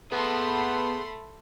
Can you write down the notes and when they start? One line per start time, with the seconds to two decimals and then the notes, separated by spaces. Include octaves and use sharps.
0.12 A3 B3 G#4 A4 F#5 B5 C6